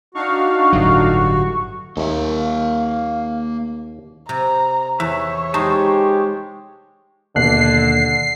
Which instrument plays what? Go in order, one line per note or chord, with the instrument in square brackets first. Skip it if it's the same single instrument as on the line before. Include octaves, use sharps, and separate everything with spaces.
[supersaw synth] D4 D#4 F5 [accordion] F#4 [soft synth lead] C#6
[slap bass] G1 A2 F#3
[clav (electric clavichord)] D#2 [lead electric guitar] A#3 E5 [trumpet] F5
[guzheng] C3 [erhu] A#5
[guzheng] E2 [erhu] C#5 [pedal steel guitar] E5
[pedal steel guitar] G#3 C5 A5 [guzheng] D#4 [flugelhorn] G4
[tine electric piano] D#2 [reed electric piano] B2 F#6 [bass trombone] D3 [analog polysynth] C7